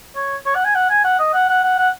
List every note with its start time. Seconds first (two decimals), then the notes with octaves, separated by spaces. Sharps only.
0.16 C#5
0.46 C#5
0.55 F#5
0.65 G#5
0.75 F#5
0.90 G#5
1.04 F#5
1.19 D#5
1.34 F#5
1.49 F#5
1.64 F#5
1.78 F#5